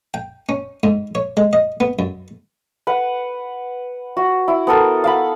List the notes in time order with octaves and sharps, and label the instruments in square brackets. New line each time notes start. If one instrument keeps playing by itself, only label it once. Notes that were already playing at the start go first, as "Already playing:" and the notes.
[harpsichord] G5
C#4
G#2
C#5
G#3
D#5
B3
F#2
[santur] B4 F#5
F#4
E4
B3 A4 A#4
F5 F#5 B5